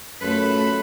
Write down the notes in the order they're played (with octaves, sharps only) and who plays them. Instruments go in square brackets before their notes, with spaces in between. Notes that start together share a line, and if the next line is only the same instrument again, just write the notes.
[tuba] F#2 [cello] A3 A4 [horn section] F4 B4 B5